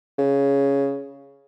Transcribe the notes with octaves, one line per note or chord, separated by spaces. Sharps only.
C#3